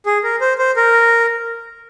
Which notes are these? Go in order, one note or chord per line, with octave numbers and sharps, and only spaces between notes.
G#4
A#4
C5
C5
A#4